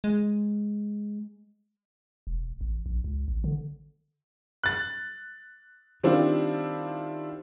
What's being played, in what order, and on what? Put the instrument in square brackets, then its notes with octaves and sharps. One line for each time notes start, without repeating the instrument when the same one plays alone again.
[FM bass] G#3
[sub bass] E1
A1
A#1
C#2
A1
D3
[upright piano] F#6 A6
D#3 G3 C4 D4 E4 F4